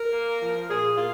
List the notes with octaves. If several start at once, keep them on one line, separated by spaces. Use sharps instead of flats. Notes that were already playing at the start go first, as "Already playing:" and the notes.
Already playing: A#4
A#3
F3
A#2 G#4
A#2 F4